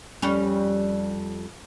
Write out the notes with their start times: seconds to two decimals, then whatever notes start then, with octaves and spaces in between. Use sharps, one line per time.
0.22 F2 G3 C#4